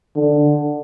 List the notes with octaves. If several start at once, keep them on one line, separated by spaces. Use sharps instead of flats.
D3